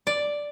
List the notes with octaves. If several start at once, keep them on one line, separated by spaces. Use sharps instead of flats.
D5